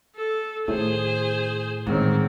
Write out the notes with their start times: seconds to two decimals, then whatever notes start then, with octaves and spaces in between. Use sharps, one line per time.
0.16 A4
0.68 A2 D#3 G#4 C5
1.86 A1 G#2 D#3 C4 C#5